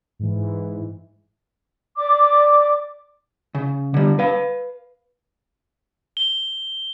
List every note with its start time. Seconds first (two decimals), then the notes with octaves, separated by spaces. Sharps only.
0.19 G#2 E3
1.97 D5 D6
3.55 C#3
3.94 D3 G3
4.19 B4 F5
6.17 G7